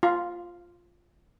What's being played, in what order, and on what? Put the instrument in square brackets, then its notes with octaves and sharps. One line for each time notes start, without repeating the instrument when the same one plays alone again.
[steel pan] F4